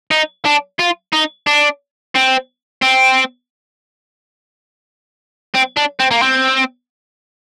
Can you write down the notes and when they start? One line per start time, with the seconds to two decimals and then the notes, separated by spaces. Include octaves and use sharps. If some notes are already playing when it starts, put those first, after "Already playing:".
0.11 D#4
0.45 D4
0.79 F4
1.13 D#4
1.47 D4
2.15 C4
2.82 C4
5.54 C4
5.77 D4
6.00 C4
6.11 A#3
6.22 C4